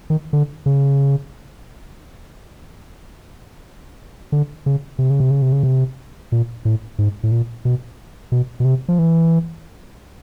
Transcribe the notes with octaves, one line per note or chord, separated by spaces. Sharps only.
D#3
D3
C#3
D3
C#3
C3
C#3
C3
C#3
C3
C#3
C3
A#2
A2
G#2
A2
A#2
B2
B2
B2
C3
F3
E3